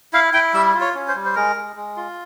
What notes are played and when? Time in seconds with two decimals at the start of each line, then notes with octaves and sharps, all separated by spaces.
0.13 E4 F5
0.33 E4 G5
0.54 G3 E5
0.75 F4
0.81 C#5
0.95 C#4
1.08 C5
1.15 G3
1.25 C5
1.35 G#3 A#4
1.56 G#3
1.76 G#3
1.97 F4